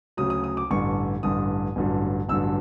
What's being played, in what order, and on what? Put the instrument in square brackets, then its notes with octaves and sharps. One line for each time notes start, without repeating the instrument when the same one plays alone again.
[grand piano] D2 C#3 F#3 D#6
D#6
D#6
D6
A1 G2 D3 C#6
A1 G2 D3 D#6
A1 G2 D3 F#3
A1 G2 D3 F#3 E6